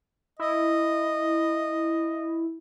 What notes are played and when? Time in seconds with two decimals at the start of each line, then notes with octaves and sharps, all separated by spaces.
0.39 E4 D#5